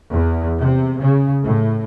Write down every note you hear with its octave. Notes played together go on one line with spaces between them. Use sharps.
E2
C3
C#3
A2